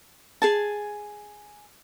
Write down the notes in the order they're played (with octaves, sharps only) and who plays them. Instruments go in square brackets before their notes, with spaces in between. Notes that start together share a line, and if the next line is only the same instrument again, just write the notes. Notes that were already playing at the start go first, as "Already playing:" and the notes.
[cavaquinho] G#4 G#5 A5